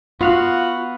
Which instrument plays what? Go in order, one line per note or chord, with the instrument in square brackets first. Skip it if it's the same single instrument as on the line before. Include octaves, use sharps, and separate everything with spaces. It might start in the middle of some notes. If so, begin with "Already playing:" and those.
[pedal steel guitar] B3 F5 F#5 [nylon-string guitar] F4 [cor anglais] F#4